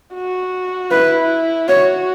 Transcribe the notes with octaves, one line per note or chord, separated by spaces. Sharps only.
F#4
E4 B4
F#4 C#5